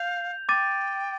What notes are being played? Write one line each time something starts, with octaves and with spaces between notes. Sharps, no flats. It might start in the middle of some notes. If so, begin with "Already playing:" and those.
Already playing: F5 G6 F7
G5 D6 A6 D#7